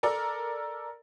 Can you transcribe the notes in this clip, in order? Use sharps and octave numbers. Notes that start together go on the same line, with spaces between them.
A4 A#4 D5